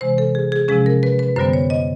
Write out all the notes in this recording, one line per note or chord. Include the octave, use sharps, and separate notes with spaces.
C3 E3 G#3 C5
A4
G#4
G#4
C3 F3 G#3 C#4 G#4
A#4
B4
B4
F#2 D3 G3 B3 C5
C#5
D#5